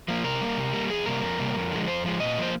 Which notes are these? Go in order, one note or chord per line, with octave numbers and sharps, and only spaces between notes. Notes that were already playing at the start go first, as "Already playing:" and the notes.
F3 A#3
C3 A#4
G3 A#3
C3
G3 A#3
F2 G#4
C3 G3 A#3 A#4
F2
C3 G3 A#3
F2
D3 F3 G#3
F2 C5
D3 F3 G#3
A#2 D#5
F3 A#3 C5